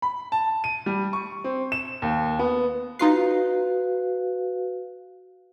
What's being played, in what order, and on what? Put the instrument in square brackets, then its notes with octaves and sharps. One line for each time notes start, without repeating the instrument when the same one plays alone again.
[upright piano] B5
A5
D#7
G3
C#6
C4
E7
D#2
B3
[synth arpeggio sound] D#4 F4 C7 [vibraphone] F#4 B4 F5